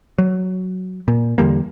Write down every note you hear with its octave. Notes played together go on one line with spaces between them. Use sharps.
F#3
A#2
E2 D3 G3 A#3